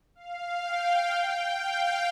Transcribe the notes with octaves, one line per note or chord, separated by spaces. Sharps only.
F5
G5
G5
F5